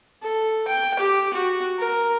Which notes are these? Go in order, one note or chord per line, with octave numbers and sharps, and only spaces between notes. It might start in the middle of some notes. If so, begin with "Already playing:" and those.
A4
G5
G4
F#4
A#4